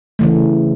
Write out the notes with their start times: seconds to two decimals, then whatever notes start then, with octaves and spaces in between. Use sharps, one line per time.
0.19 C#3 E3 A3